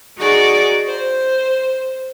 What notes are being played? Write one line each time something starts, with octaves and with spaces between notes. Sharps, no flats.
D#4 F#4 G#4 D5 C#6
C5